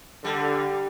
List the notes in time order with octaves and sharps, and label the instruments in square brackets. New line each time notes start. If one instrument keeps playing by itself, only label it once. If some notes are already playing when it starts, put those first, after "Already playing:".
[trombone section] D3 [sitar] G3